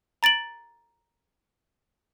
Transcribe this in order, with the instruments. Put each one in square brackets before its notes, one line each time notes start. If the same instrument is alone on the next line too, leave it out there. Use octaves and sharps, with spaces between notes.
[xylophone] A#5 A6 D7 F#7